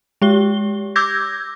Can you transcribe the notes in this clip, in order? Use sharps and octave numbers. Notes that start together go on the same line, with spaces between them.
G#3 G4 G7
D6 E6 G6 G#6 A#6